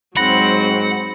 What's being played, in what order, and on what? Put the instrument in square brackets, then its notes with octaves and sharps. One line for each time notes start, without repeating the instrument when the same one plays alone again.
[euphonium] G#2 [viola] F#3 C4 [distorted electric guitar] F#5 [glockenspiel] B5 A#6 C#7